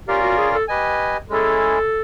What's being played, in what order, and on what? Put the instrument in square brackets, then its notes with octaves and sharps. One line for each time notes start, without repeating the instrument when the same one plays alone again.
[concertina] C#4 F4 A#4 D5 F5 [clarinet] G4
[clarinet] F#4
G#4
A4
[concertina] G4 B4 D#5 G#5
[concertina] G#3 C#4 E4 G#4 [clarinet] A4